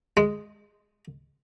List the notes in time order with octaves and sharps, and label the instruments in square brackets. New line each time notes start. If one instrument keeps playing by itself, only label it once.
[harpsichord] G#3